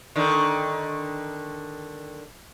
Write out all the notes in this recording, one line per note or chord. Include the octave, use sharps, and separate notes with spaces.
D3 D#3